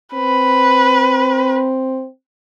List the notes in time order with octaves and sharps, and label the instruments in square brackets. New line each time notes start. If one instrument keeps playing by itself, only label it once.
[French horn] C4 [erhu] B4